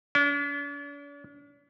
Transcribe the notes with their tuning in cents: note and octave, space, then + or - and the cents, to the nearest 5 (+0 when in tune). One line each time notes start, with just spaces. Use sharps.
D4 -45